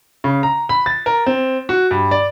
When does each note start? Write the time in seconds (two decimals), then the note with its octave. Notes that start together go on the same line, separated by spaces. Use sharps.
0.24 C#3
0.43 A#5
0.69 B5
0.86 A6
1.06 A#4
1.26 C4
1.69 F#4
1.91 G2
2.11 D5